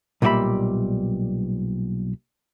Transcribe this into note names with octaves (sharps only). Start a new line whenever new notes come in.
B1 A#2 G3 F#4 E5 B5